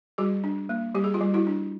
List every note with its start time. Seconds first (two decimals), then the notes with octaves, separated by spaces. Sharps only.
0.18 G3 F#4 G#4
0.44 D4
0.69 A#3
0.95 G3 G4
1.04 G#4
1.14 F4 G4
1.21 G3
1.34 E4 F#4
1.47 D4